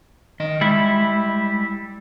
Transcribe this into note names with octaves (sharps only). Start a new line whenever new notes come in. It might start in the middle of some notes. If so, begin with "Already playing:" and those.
D#3 D#5
G3 G#3 E4